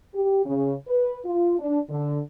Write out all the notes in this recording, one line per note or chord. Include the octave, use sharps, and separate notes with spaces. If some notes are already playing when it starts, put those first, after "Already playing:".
G4
C#3
B4
F4
D4
D3